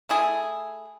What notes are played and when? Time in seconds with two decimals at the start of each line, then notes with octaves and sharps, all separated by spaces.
0.09 A3 E4 G#4